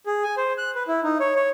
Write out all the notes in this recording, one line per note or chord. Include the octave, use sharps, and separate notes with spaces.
G#4
G#5
C5
F#6
B4
E4
D#4
C#5
C#5